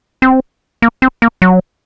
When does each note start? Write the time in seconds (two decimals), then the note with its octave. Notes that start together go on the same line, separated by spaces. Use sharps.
0.22 C4
0.82 A#3
1.02 C4
1.22 A#3
1.42 F#3